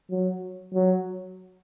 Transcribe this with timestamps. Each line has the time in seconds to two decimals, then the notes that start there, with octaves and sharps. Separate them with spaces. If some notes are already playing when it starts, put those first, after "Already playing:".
0.11 F#3
0.74 F#3